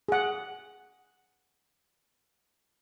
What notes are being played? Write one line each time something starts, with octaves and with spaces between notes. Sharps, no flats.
G#4 F#5